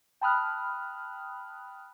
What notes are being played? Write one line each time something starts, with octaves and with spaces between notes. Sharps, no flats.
G5 A5 B5 D#6 F6 F#6